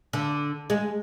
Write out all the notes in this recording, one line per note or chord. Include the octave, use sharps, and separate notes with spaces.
D3
G#3